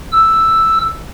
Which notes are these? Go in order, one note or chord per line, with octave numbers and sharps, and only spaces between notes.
E6